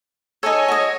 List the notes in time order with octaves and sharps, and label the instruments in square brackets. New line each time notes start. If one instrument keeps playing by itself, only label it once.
[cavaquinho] D#4 A4 [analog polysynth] C#5 G#5
[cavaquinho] F#4 D#5